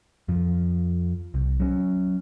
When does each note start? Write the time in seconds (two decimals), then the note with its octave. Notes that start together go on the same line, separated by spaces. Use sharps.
0.28 F2 F3
1.34 C2
1.60 F#3 C#4